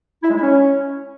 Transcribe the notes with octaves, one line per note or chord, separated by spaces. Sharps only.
E4
G#3
E4
C#4